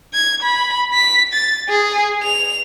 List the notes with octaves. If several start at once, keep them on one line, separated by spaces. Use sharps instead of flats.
G#6
B5
B6
A6
G#4
F7